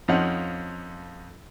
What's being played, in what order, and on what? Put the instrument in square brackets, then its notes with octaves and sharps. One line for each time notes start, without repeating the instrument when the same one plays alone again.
[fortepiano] F2 F3 C#4 D#4 F#5